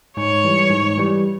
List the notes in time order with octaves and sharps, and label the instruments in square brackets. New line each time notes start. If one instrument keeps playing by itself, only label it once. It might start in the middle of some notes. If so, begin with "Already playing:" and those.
[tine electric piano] G#2 [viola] C#5
[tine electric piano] E3 G3
G#2
E3 G3